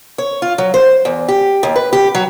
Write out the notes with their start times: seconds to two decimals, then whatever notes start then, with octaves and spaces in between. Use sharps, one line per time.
0.18 C#5
0.42 F4
0.58 F#3
0.74 C5
1.05 E2
1.28 G4
1.63 D#2
1.76 B4
1.93 G4
2.15 F#3